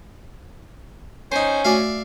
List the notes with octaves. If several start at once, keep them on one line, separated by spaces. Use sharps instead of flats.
C#4 D#4 C5
A3 F#4 D5 E5 F5 G#5